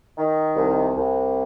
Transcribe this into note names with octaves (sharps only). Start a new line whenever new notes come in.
D#3
C2
C2